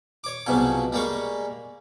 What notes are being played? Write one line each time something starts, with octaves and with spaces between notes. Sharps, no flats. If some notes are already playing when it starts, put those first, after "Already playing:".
C#5 D6
C2 G#2 B2 F3 F#3 G#5
G3 G#3 A#3 C#6